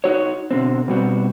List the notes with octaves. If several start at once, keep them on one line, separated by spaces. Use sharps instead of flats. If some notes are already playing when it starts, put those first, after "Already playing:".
D#4 F#4 C#5
B2 D3 C4
B2 G3 C4 F#4